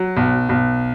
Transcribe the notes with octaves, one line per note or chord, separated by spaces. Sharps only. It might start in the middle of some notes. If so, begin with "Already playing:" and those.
Already playing: F#3
B1
B1